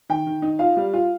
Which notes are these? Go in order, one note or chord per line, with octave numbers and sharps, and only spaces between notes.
D#3 G5
D#3
D#4
F4 F5
G3
F4